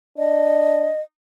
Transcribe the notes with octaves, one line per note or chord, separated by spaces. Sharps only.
D4 D#5